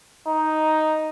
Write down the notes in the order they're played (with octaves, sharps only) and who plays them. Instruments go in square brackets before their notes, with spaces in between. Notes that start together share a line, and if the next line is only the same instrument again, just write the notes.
[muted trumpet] D#4